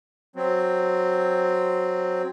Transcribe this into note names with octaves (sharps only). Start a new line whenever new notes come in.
F#3 C4